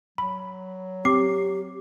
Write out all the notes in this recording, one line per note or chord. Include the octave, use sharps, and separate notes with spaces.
F#3 B5
C4 G4 D6 C7